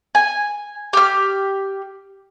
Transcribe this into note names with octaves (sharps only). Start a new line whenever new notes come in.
G#5
G4 F6